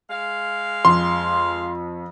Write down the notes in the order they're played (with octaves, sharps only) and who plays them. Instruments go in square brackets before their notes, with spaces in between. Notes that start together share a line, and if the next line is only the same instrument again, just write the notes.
[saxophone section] G#3 F5
[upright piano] F2 [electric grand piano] C6